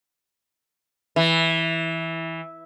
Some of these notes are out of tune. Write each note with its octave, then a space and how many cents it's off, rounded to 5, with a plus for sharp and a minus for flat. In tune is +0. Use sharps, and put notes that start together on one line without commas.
E3 -10